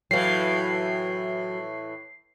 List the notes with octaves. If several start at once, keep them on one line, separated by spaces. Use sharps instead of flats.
A2 E3 F#3 F5 C7